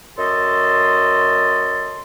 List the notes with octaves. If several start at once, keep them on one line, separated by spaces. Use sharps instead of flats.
F#2 F#4 A4 D#5 C6